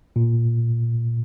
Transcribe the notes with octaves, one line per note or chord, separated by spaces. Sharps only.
A#2